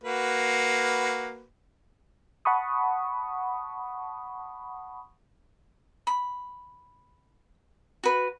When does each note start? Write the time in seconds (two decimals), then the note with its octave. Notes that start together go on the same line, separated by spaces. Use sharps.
0.04 A#3 F#4 B4
2.45 F#5 A5 B5 C#6 D#6
6.07 B5
8.04 F#4 B4